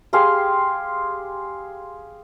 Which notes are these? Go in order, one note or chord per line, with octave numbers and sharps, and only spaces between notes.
G4 G#4 F5 C6